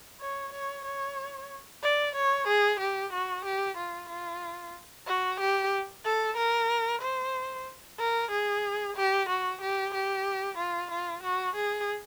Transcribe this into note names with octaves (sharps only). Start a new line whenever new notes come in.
C#5
C#5
C#5
D5
C#5
G#4
G4
F#4
G4
F4
F4
F#4
G4
A4
A#4
C5
A#4
G#4
G4
F#4
G4
G4
F4
F4
F#4
G#4